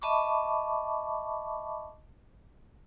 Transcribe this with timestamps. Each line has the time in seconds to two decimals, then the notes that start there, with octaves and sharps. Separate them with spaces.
0.02 D#5 E5 A5 B5 C#6 D6